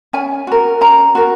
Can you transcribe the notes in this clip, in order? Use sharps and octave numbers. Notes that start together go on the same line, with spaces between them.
C#4 G#5
F#4 A#4
C#4 A#5
F#4 A#4